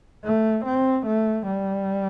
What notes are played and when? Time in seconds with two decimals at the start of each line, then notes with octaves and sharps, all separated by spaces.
0.25 A3
0.65 C4
1.06 A3
1.47 G3